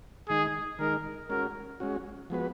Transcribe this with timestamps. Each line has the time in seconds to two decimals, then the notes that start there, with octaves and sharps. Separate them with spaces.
0.29 D#3 G#3 D#4 G#4
0.79 D#3 G#3 D#4 A#4
1.30 G#3 C#4 F#4 A#4
1.80 G#3 C#4 F#4
2.30 F3 G#3 B3 F#4 B4